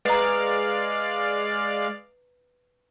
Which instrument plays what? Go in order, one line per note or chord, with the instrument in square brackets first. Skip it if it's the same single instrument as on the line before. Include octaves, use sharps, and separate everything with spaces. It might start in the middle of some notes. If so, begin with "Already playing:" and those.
[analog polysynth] G#3 D5 F5 [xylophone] B4 A#5